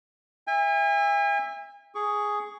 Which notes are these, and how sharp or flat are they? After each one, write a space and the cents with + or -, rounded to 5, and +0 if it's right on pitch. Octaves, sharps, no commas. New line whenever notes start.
E5 +0 G#5 -40
G#4 +0 C#6 +20